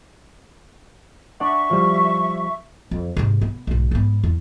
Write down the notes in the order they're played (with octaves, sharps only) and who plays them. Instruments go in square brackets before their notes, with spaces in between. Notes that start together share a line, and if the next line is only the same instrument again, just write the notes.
[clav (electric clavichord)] D4 D5 F#5 [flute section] E5 C#6
[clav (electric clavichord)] F3 G3
[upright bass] F2
G#2 C3
B3
B1 G#2
G#2 B3
E2